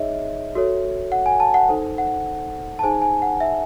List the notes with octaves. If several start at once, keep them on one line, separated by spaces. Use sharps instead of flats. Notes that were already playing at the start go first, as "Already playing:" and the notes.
Already playing: D#4 G#4 C#5 D#5 E5
F#4 A4 C#5
F#5
G#5
A5
F#5
D#4 A4 C5
F#5
A5
D#4 G#4 C5 G#5
G#5
F#5
E5